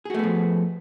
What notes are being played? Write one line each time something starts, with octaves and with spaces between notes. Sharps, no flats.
F3 A3 B3 F#4 G#4